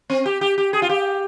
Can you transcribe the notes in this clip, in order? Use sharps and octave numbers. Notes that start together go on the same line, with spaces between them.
C4
G4
G4
G4
G#4
F4
G4